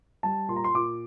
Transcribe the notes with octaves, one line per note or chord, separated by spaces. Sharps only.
G3 A5
A#2 C6
A#5
C6
A#2 D6